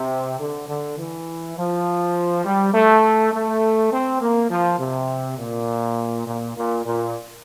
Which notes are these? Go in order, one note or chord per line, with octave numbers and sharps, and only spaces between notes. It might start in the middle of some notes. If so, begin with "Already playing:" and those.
Already playing: C3
D3
D3
E3
F3
G3
A3
A3
C4
A#3
F3
C3
A#2
A#2
A#2
A#2